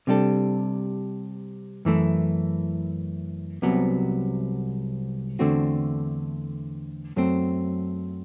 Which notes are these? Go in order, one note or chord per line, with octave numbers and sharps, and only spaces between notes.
C3 G3 D4 A4
F#2 E3 A3 E4
C2 C3 F#3 B3
E2 D3 A3 C4 F#4
F#2 F#3 A3 C4